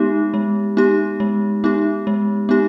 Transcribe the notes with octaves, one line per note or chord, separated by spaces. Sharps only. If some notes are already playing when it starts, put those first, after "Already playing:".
Already playing: G#3 B3 D#4 G4
G#3
B3 D#4 G4
G#3
B3 D#4 G4
G#3
B3 D#4 G4